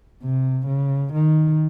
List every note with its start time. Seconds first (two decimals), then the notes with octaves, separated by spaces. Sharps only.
0.23 C3
0.67 C#3
1.13 D#3